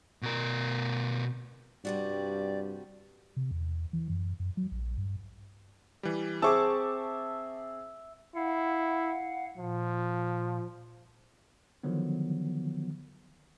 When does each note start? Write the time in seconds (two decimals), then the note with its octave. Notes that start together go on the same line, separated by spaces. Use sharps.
0.22 B2 A#4
1.85 G2 C3 G3 F#4 D5
3.37 C3
3.51 E2
3.93 E3
4.09 F#2
4.40 F#2
4.57 F#3
4.71 A#1
4.97 G2
6.03 E3 G3
6.42 C4 G#4 E5 A5 C#6 D6
8.36 E4 F5 F#5
9.58 A#2 F3
11.83 D3 D#3 F3 F#3 B3